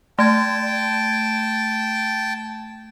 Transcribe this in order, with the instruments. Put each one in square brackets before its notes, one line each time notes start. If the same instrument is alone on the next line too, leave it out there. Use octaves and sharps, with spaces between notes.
[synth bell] A3 G#6 [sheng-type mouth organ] G5 A5